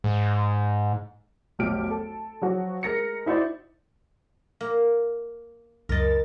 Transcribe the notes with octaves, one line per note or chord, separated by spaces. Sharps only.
G#2
F1 B1 G4 F6 D7
A4
F3 F#3 F#4
G#3 A#4 A#6 C#7
D#4 E4 F#4 C5 D5
A#3
C#2 F#2 A#4 D#5 A6